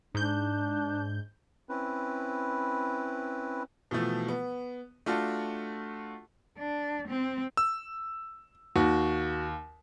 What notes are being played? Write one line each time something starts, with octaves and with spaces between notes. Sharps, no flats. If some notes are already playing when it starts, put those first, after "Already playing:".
G#2 D4 G6
C4 C#4 E4 B4
B2 E3 F3 A3
B3
A3 D4 F4 F#4 A5
D4
C4
E6
D#2 F#4